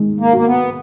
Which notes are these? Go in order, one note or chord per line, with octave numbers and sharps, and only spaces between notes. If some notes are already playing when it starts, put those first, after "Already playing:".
Already playing: D#3 G#3
A#3
A#3 F#4
B3